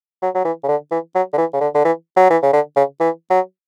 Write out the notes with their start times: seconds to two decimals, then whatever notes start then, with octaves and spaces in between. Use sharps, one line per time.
0.22 F#3
0.35 F#3
0.45 E3
0.63 C#3
0.68 D3
0.91 E3
1.15 F#3
1.33 D3
1.38 E3
1.53 C#3
1.61 D3
1.74 D3
1.85 E3
2.16 F#3
2.30 E3
2.42 C#3
2.53 D3
2.76 C#3
3.00 E3
3.30 F#3